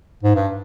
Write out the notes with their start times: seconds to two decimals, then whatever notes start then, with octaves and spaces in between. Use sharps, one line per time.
0.23 G#2
0.35 G2